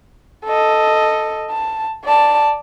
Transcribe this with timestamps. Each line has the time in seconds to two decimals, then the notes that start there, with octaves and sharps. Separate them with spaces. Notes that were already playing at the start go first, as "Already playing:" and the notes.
0.45 A4 D#5
1.50 A5
2.04 D5 A5